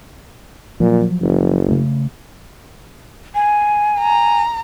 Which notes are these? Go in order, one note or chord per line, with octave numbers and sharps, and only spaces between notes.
A#2 F3 F#3
F#1
C#3 A3
G#5
A#5